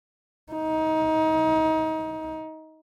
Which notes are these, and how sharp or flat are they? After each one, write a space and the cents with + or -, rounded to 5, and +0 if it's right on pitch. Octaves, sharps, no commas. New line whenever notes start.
D#4 +25